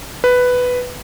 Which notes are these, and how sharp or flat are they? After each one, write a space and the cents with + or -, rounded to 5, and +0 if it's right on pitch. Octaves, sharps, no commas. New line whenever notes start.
B4 +5